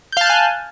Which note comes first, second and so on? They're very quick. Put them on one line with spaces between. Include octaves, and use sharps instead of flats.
G6 F5 A5 F#6 G#5